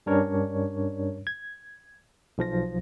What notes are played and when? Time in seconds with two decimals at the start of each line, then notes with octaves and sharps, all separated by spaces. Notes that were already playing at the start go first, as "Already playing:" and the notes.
0.06 G2 G3 C#4 D4 A#4 C#5
1.27 G#6
2.38 B1 F3 A#6